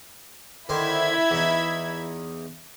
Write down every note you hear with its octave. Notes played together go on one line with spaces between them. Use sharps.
D3 D#3 E4 C5 E5 G#6
E2 D#4